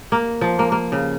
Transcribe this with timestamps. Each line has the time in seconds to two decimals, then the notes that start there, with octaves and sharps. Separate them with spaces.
0.12 A#3
0.41 F3
0.59 A#3
0.72 A#3
0.92 C#3